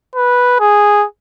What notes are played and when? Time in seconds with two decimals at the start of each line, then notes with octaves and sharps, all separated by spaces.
0.15 B4
0.59 G#4